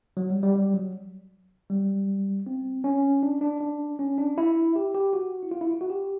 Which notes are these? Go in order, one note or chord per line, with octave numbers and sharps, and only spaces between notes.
F#3
G3
G3
G3
F#3
G3
C4
C#4
D4
D4
D4
C#4
D4
E4
G4
G4
F#4
E4
F4
E4
F4
F#4
G4